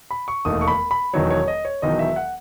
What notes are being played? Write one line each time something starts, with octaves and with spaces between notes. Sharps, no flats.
B5
C#6
E1 D#2 D#3 A3 D#6
C#6
B5
B5
E1 E2 D#3 F#3 C#5
C#5
D#5
C#5
E1 E2 D#3 F#3 D#5
E5
F#5